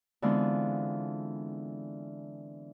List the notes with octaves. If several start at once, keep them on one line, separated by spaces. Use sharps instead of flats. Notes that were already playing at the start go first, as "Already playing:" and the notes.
D3 E3 G#3 B3 C4 F4